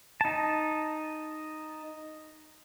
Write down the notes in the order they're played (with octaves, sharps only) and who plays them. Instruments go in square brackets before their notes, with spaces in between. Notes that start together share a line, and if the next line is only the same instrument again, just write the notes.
[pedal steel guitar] D#4 A5